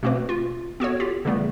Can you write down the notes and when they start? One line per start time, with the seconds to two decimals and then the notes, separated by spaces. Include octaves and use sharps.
0.03 B2 A3 A#3 C4 B4
0.29 F4
0.80 B3 F#4 A4 C#5
1.00 F4 G4
1.25 C#3 E3 G3 A3 B3